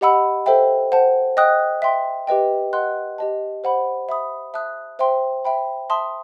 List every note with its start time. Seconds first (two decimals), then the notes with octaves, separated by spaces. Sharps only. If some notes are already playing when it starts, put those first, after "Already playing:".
0.01 G4 D#5 F#5 B5 E6
0.46 A4 C5 E5 G5
0.92 C5 F#5 A5
1.37 D#5 G5 D#6 F#6
1.82 E5 G5 C6
2.27 G4 B4 D#5 G5
2.73 D#5 F#5 C6 F#6
3.18 G4 D#5 A5
3.64 C5 F#5 B5
4.09 E5 B5 D#6
4.54 E5 A5 D#6 F#6
4.99 C5 E5 G5 C6
5.45 E5 G5 B5
5.90 E5 A5 C6 D#6